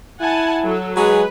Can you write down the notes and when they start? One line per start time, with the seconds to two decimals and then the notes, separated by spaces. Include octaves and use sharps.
0.21 E4 F#5 G#5 A5
0.64 F#3 A4
0.97 F#3 G#3 G#4 B4